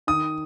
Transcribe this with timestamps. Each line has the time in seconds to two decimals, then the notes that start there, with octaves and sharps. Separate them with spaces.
0.07 D#3 D#6